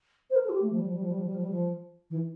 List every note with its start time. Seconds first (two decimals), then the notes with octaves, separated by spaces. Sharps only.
0.30 C5
0.35 A#4
0.44 A4
0.49 F4
0.53 G4
0.62 A3
0.71 F3
0.78 G3
0.86 F3
0.94 G3
1.02 F3
1.10 G3
1.18 F3
1.26 G3
1.34 F3
1.42 G3
1.51 F3
2.10 E3